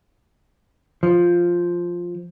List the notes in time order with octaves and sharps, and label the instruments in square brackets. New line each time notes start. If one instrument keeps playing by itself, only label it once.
[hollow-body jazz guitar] F3